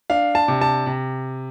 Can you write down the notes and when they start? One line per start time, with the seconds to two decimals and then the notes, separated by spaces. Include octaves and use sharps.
0.10 D4 F5
0.35 A5
0.48 C3
0.61 A5
0.86 C3